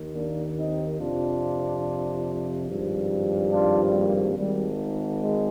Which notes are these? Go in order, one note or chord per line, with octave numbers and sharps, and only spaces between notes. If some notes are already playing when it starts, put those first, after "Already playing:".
Already playing: D#2 D#3
A#3 D4
C4 D#4
F2 C3 F3 D4 F4
G#1 G2 F3
D4 F4
G3 A#3
G#1 G#2 D#3 G3
G#3